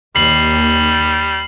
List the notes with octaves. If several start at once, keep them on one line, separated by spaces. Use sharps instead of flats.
D#2 G3 C7 F#7